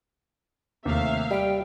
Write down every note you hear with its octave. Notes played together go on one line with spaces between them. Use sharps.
D#2 C3 A3 E5 F5
G3 G5 B5